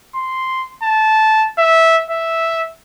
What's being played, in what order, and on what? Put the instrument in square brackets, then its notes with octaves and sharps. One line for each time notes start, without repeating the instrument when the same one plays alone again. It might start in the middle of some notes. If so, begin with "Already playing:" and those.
[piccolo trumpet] C6
A5
E5
E5